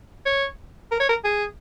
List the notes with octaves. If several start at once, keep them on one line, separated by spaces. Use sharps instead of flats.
C#5
A#4
C#5
A#4
G#4